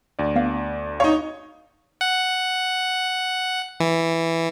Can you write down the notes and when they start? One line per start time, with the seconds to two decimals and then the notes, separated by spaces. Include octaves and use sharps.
0.19 D2 D4 D5
0.36 B3 F5
1.00 D#4 C#5 F5 C#6
2.01 F#5
3.80 E3